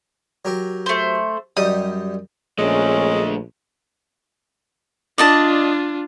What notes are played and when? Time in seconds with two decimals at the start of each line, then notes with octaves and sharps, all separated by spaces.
0.45 F#3 G4 A#4
0.86 A3 C5
1.57 F#2 G3 D#4 D#6
2.58 A#1 G#3 A3 C#4 D4
5.18 D4 F4 D5 D#5 A5